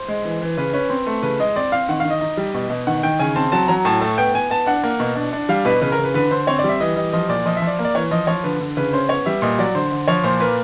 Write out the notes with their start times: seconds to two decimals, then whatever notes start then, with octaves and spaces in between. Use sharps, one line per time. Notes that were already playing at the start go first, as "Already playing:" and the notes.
Already playing: C5
0.08 G#3
0.25 E3
0.42 E3
0.58 C#3 B4
0.73 C#4 B4
0.90 C4
1.07 A3
1.23 C#3 B4
1.40 G#3 D#5
1.56 C4 D5
1.72 C4 F5
1.89 D#3 F#5
2.00 D#3 F5
2.10 D#5
2.21 D#4
2.37 G3
2.54 B2
2.70 B2
2.87 D#3 F#5
3.03 D#3 G5
3.19 C#3 G#5
3.35 C4 A5
3.52 F#3 A5
3.68 F#3 A#5
3.85 A2 A5
4.01 A3 A5
4.18 B3 G5
4.34 B3 G#5
4.50 B3 A5
4.66 D4 F#5
4.83 A#3
5.00 B2
5.16 D4
5.33 D4
5.49 G3 F5
5.65 B2 B4
5.81 C#3 B4
5.92 A#4
5.98 C#3
6.04 B4
6.14 D3 B4
6.31 D3 C5
6.47 C4 C#5
6.59 D5
6.64 G3 E5
6.80 E3 D#5
6.96 G3 D#5
7.12 F3 D#5
7.29 A#2 D5
7.46 F3 D#5
7.57 E5
7.62 F3
7.67 D5
7.79 A#3
7.85 D5
7.94 E3 C#5
8.11 F3 D#5
8.27 F3 C#5
8.44 D3 B4
8.60 D3
8.77 C#3 B4
8.93 C#4 C5
9.09 B3 C#5
9.26 G3 E5
9.42 A#2 D#5
9.59 F#3 D5
9.75 D3 C5
9.92 D3
10.08 F3 C#5
10.24 A#2 C5
10.40 A#3 B4